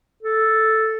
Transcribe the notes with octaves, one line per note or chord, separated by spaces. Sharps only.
A4